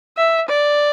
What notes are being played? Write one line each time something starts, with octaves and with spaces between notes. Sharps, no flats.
E5
D5